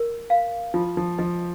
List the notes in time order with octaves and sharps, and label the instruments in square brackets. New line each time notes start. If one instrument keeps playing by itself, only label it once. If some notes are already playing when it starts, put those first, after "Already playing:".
Already playing: [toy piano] A#4
F5
[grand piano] F3 [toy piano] F4
[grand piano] F3
[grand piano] F3 [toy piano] D#5